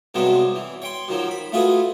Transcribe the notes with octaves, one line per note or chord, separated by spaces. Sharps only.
G2 C3 F#3 G#3 B3 D4
E3
C#5 G5 C6
F#2 D#3 F3 F#3
B5
A3 F4 F#4 G#4 B4